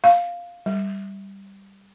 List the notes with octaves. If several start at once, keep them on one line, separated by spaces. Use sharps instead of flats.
F5
G3